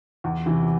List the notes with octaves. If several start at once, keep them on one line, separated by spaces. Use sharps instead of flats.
E2
C3 E3